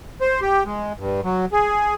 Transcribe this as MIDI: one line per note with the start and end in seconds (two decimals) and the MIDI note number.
0.21 0.40 72
0.42 0.63 67
0.65 0.93 56
0.98 1.21 43
1.24 1.45 54
1.52 1.94 68